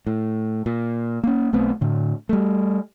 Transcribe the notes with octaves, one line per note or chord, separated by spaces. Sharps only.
A2
A#2
A#3 C#4
B1 A3 B3 C4
A2 D3
G3 A3